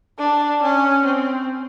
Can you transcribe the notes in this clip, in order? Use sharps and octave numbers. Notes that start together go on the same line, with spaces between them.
D4
C#4
C4